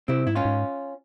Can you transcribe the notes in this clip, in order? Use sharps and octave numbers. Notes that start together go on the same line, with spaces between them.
C3 C4 E4
G#2 E4
C#4 F4
G#2